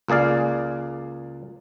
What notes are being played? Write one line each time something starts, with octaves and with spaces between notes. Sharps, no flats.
C#2 A#3 G#4 D5 F5